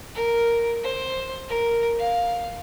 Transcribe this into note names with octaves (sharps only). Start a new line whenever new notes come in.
A#4
C5
A#4
F5